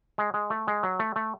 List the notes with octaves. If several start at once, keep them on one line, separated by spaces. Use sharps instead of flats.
G#3
G#3
A3
G#3
F#3
A3
A3